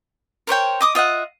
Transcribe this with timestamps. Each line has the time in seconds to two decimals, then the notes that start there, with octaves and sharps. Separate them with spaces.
0.47 A#4 C5 C#5 G5
0.81 D#5 D6 D#6
0.95 F4 D#5 E5 F#5